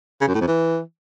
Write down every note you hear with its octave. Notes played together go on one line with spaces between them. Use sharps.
C#3
F#2
A2
F2
E3